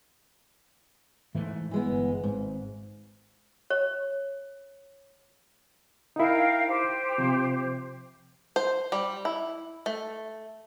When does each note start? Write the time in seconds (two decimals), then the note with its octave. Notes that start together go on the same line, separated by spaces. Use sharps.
1.35 G#2 E3 A3
1.71 E3 G#3 B3
1.85 G1
2.24 G#1 G#2
3.70 C#5
6.16 D#4 E4 A#4 F5 G5
6.68 G4 C5
7.18 C3 F3
8.56 C5
8.92 G3
9.25 E4
9.86 A3